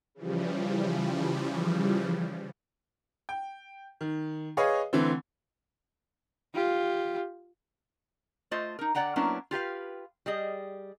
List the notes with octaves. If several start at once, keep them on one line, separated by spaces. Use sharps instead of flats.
C#3 E3 F3 G3
G5
D#3
G#4 B4 C#5 D#5 F5
D3 E3 A3 C4
F4 G4
A3 F4 C5 D#5
D#4 A#4
D3 C5 D5 F#5 G5 A#5
F#3 A#3 B3 C#4 D4 E4
F4 G4 B4 F5
G3 G#4 D#5